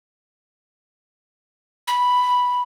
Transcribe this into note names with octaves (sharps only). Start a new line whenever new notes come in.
B5